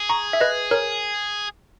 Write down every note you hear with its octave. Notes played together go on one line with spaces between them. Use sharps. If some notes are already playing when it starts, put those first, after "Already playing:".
Already playing: G#4
A#5 C#6
E5
B4 D#5
A#4 C#5